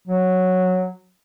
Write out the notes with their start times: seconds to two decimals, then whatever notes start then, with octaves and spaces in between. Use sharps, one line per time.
0.07 F#3